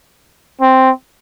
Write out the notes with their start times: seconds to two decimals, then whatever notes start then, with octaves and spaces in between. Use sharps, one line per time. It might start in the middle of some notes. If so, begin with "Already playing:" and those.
0.61 C4